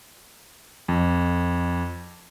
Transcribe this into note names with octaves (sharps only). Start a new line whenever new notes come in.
F2